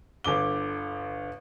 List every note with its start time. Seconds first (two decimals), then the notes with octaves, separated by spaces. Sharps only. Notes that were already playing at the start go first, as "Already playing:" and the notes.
0.24 G1 D3 D6 G7